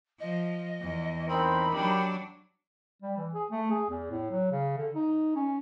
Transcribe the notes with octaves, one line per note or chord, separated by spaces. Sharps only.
F3 D#5
E2
C4 D#4 A#4 B5
F#3 D4 G4
G3
E3
G#4
A3
G#4
E2
A2
F#3
C#3
D3
D#4
C#4